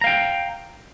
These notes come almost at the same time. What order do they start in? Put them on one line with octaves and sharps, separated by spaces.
A#5 F5 G5